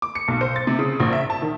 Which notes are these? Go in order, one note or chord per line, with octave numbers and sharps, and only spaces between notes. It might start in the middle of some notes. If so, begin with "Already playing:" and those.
D6
C#7
B1
C5
A6
C3
C#3
A#1
E5
A5
D#3